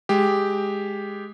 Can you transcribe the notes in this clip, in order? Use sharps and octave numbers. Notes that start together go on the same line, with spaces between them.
G#3 G4